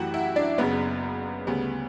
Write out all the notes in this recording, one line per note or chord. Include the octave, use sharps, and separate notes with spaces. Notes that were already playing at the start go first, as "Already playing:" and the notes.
Already playing: F#2 E3 A3 F#4 G4 F#5 G5
E4 E5
D4 D5
F#1 F#2 C#3 B3 B4
D2 C#3 G3 B3